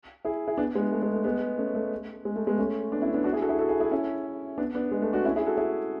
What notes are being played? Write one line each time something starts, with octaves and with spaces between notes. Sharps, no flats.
E4 G#4
E4 G#4
B3 D4
G#3 B3
A3
G#3
A3
G#3 B3
A3 C#4
A3
G#3
A3
G#3 B3
A3 C#4
B3 D4
C#4 E4
B3 D4
D4 F#4
E4 G#4
F#4 A4
E4 G#4
F#4 A4
E4 G#4
E4 G#4
C#4 E4
B3 D4
B3 D4
G#3
A3
D4 F#4
C#4 E4
E4 G#4
F#4 A4
E4 G#4